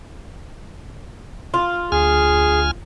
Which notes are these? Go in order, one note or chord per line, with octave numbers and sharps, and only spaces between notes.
F4
D2 G#4 G#5 F6